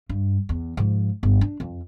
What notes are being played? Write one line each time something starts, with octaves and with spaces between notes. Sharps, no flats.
G2
E2
G#2 F3
G1
D4
F2